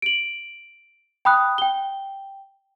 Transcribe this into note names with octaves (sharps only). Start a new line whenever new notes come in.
D7 F#7
G5 B5 D#6 F#6
G5 G7